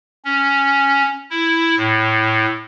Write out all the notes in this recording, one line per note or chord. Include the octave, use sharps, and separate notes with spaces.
C#4
E4
A2